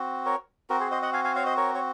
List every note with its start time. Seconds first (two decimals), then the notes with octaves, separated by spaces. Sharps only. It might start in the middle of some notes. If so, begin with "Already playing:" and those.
Already playing: C4 F#4
0.26 A#4 C#5
0.70 C4 F#4 A#4
0.80 G#4 C5
0.91 C5 D#5
1.02 D#5 F#5
1.13 F5 G#5
1.24 F5 G#5
1.36 C#5 F5
1.46 C5 D#5
1.57 A#4 C#5
1.75 C#5